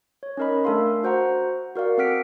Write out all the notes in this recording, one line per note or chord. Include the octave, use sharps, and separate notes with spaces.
C#5
C#4 D#4 A#4 D#5 B5
A3 D4 A4 A#4 F5 C6
F#4 C5 F#5 A#5
F#4 A#4 D5 F5 F#5
C4 A4 F#5 F6 B6 D7